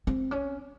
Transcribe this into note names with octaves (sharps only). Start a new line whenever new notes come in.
C4
C#4